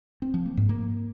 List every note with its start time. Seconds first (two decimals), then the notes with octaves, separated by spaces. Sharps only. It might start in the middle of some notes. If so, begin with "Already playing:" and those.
0.22 C4
0.34 F3
0.46 A#3
0.57 G#2
0.69 A#3